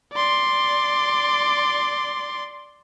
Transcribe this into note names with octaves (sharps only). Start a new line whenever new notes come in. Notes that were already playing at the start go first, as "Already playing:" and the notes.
D5 C6